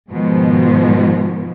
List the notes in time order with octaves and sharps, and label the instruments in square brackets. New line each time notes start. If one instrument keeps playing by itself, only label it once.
[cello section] G#2 B2 D#3 F3 G#3